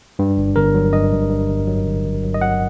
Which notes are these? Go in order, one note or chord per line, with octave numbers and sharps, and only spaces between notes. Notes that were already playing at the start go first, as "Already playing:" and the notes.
G2
G1
G1 A#4
F#3
G2 D#5
G1
G2
G1
F#3
G1
G1
F#3
D#5
F#3 F#5